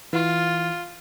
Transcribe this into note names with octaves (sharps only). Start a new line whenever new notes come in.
E3 F4